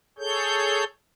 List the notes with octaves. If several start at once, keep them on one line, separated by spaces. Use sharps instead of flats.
G#4 A4 C#5 G6